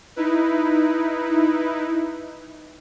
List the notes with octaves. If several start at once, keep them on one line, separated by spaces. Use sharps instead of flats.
D#4 E4 B4